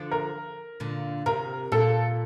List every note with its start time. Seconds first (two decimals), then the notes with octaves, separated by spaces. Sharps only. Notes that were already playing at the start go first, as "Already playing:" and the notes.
Already playing: D3 F3
0.11 A#4
0.80 A#2 D3
1.26 C3 A#4
1.72 A#2 A4